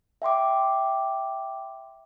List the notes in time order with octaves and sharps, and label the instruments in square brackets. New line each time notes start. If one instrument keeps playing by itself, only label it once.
[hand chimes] E5 G5 C6 D6